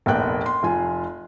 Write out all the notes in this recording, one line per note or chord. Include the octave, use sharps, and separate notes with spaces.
F1 A#1 A#3 B3 G5 F#6
C6
F1 F4 G#5